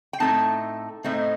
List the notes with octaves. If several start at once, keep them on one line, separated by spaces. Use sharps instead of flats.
G5
A2 A3 C4 D#4 A5
A2 A3 C4 D#4